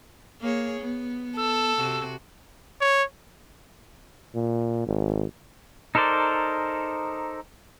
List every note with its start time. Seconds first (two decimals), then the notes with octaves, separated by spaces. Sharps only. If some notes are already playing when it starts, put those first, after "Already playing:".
0.41 A#3 G#4 C#5
0.81 B3
1.36 A4 E6
1.77 C3 F#4
2.81 C#5
4.35 A#2
4.87 G#1
5.95 D#4 A4 A#4 C5 D5